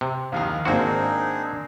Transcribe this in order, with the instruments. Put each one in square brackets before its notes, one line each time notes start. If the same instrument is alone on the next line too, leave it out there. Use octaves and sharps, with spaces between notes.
[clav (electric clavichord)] C3
[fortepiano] A#1 D#2 D#3 [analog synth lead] F5
[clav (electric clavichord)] G#1 F#4 [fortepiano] A#3 C5 [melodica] C4 D#4 G#4 [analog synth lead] D4